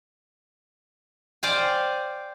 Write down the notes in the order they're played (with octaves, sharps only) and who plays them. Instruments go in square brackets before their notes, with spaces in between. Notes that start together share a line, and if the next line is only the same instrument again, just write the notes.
[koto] C5 D5 F5 G5 G#5